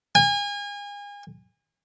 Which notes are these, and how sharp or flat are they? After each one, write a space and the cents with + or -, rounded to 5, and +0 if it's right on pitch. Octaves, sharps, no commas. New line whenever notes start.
G#5 -35